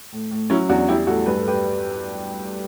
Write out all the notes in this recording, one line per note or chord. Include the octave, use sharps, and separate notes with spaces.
A2
A2
F#3 C#4 E4
E2 D4 F#4
G3 E4 G4
A2 F#4 A4
G2 B4
A4
G4 B4